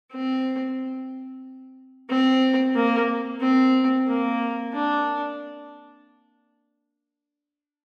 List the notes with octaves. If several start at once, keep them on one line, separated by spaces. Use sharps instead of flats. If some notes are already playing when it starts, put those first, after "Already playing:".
C4
C4
A#3
C4
A#3
D4